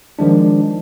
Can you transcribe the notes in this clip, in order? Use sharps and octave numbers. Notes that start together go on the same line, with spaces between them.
D#3 F3 G#3 D4